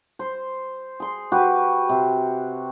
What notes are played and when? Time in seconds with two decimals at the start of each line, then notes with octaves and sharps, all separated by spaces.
0.19 C5
1.00 G#4 C6
1.32 F#4 G4 B4
1.89 C3